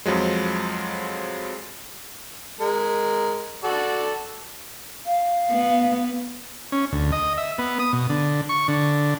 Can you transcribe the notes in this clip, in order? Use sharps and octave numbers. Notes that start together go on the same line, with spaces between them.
F2 F3 F#3 G#3
G#3 A#4
F#4 A4 D5
F5
B3
C#4
D2
D#5
E5
B3
D#6
B2
D3
C#6
D3